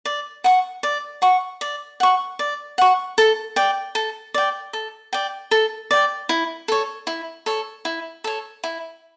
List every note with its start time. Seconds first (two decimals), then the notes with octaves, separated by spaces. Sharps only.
0.05 D5
0.44 F#5 C#6
0.83 D5
1.22 F#5 C#6
1.61 D5
2.00 F#5 C#6
2.39 D5
2.78 F#5 C#6
3.18 A4
3.56 D5 G5
3.95 A4
4.34 D5 G5
4.73 A4
5.13 D5 G5
5.51 A4
5.91 D5 G5
6.29 E4
6.68 A4 C#5
7.07 E4
7.46 A4 C#5
7.85 E4
8.24 A4 C#5
8.64 E4